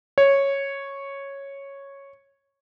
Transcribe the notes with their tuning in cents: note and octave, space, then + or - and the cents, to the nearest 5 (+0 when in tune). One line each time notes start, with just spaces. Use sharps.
C#5 -5